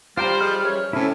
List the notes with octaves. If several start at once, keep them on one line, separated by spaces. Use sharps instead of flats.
G3 F4 G4 C5 G5 A#5
F3 G#3 F6
F#2 E3 C#5
F#2 A2 C3 C#4 E4